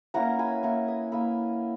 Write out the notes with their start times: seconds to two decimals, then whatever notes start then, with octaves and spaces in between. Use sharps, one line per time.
0.14 A#3 C#4 E4 F#5 A#5
0.39 G#5 B5
0.63 A#3 E4 A#5 C#6
0.88 B5 D#6
1.12 A#3 E4 B5 D#6